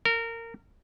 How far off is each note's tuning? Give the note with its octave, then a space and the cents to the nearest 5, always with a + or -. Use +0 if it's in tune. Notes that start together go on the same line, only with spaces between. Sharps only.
A#4 -20